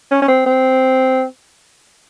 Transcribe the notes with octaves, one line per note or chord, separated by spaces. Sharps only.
C#4
C#4
C4
C4